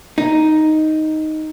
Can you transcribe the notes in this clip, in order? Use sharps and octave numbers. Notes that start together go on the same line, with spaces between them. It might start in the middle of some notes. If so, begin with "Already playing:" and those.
D#4